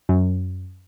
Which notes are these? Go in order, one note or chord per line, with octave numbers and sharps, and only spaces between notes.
F#2